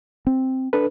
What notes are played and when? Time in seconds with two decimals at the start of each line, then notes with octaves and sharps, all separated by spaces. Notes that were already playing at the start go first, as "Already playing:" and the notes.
0.27 C4
0.73 D4 A4 B4